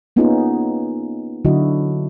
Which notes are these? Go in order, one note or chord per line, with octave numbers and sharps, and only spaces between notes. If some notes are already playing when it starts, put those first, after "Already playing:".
A#3 B3 C#4 D#4 F4 G#4
D3 F#3 D4 E4 F#4 D#5